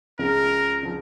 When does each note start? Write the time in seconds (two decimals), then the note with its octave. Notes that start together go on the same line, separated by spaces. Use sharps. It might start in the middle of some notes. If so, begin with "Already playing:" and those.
0.19 C#2 C#3 F3 A#4
0.83 C#3 F3